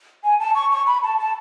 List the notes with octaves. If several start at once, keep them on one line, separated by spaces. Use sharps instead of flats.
G#5
A5
C#6
C#6
B5
A5
A5